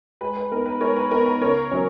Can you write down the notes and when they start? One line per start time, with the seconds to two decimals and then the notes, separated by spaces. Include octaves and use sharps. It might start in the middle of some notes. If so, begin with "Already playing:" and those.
0.21 G#3 B4
0.37 B4
0.52 B3 D#4 A#4
0.66 B4
0.81 G#3 A#4 C#5
0.96 B4
1.11 B3 D#4 A#4
1.26 B4
1.41 C#3 A#4 C#5
1.71 F#3 C#4